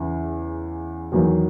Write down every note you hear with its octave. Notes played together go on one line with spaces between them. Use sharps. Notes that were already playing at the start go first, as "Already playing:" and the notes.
Already playing: E2 C#3 E3
E2 D#3 F#3